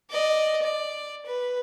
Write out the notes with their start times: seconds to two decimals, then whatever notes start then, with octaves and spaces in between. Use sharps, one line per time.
0.11 D5 D#5
0.62 D5
1.26 B4